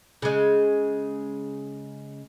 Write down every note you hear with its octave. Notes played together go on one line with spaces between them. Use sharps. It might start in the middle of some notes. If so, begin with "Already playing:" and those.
C#3 G#3